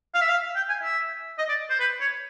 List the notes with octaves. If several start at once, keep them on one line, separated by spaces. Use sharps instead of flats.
F5
E5
F5
G5
G#5
E5
D#5
D5
C5
B4
C#5